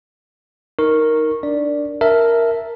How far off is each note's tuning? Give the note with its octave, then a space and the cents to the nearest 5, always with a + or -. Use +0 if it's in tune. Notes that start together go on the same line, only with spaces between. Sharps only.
D#4 +10 A#4 +0 C#6 -15
D4 +0 D5 +0
A#4 +0 E5 +0 A5 +0